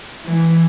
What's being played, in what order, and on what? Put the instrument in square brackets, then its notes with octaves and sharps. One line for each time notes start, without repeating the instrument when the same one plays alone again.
[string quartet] E3